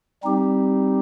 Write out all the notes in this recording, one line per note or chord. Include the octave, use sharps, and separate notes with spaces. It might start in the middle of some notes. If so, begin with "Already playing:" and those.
G3 C4 D#4 G4